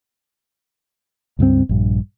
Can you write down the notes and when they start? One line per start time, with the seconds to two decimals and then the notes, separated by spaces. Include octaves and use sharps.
1.39 C#2 G2 F3 C4
1.69 A#1 G2